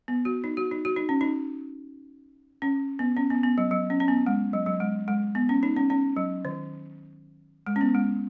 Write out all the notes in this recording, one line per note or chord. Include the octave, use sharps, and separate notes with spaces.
B3
F#4
D#4
F#4
D#4
F#4
D#4
C#4
D#4
C#4
B3
C#4
B3
B3
F#3
F#3
C#4
C#4
B3
G#3
F#3
F#3
G#3
G#3
B3
C#4
D#4
C#4
C#4
F#3
D#3
G#3
C#4
B3
G#3